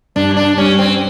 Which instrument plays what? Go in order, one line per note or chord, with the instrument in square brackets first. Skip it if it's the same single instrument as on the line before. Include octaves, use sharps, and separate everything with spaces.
[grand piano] G2 [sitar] D4
[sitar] D4
[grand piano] G3 [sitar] C#4
[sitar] C4